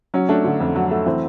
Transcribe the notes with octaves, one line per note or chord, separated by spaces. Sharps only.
F#3 C#4
A3 D4
D3
F2
F#3
A3
E3 C4